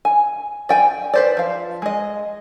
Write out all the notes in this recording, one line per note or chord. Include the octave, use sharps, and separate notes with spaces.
G#5
D5 G5 G#5
B4 C5 D5
F3 F5
G#3 D#5